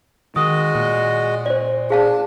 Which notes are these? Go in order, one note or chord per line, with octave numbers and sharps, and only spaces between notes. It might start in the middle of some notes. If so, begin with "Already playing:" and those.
D#3 G#3 F#4 D#5 D#6
A#2
C5 D5
D4 G#4 F5 A5